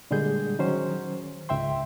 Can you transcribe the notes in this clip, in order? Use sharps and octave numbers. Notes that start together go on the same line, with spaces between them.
A#2 D3 G3 G#3 G#4 G6
D#3 F#3 C#4 C5
C#2 G#2 E5 G5 C6